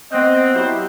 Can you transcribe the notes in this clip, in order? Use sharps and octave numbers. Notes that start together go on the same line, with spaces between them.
B3 C4 D#5 F#6 G6
F#3 E4 G4 C5